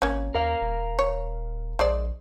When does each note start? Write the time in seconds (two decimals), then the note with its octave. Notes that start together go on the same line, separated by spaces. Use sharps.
0.02 G#1 A#3 C#4
0.35 D#2 A#4 F5
0.61 D#1
0.99 C#5
1.79 A#1 G#3 C5 D5